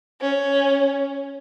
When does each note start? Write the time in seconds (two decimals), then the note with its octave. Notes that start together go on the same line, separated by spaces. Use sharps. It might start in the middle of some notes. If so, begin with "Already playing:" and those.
0.21 C#4